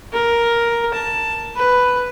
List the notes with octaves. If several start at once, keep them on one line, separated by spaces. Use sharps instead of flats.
A#4
A5
B4